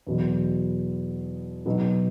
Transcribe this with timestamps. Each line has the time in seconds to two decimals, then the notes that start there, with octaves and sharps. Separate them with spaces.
0.07 E2 B2 F#3
1.66 B2 F#3 B3 D#4